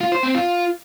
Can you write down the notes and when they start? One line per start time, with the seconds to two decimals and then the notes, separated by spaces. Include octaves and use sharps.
0.01 F4
0.12 C5
0.23 C4
0.35 F4